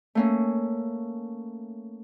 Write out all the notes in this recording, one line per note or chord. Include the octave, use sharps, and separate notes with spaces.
A3 A#3 C#4